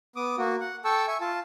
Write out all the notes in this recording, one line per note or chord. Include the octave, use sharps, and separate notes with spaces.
B3 D6 D#6
A#3 F#4
F#5
A4 G5 A5 C#6 E6
E5 G#5 C#6
F4 A5